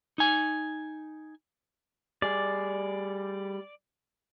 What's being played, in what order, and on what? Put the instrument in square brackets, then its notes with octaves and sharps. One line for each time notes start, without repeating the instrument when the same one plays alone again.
[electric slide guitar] D#4 G#5
[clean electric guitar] G3 G#4 [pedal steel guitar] D5